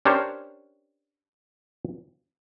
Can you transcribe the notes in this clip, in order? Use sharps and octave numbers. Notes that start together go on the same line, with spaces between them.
C#4 D4 G4 A#4 C5 C#5